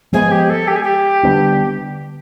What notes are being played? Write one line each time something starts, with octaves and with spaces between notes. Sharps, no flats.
F3 G#3 B3 G#4
G4
A4
G4
G#4
G4
D3 G3 B3 D4